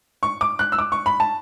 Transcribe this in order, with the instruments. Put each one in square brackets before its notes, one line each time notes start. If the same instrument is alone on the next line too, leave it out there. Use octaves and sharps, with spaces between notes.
[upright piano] C#6
D6
F#6
E6
D6
C#6
B5
A5